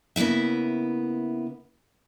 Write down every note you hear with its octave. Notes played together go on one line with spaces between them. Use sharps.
C#3 A#3 B3 E4 E5